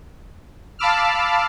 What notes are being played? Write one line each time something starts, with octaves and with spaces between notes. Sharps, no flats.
F5 A5 B5 D6 E6 F6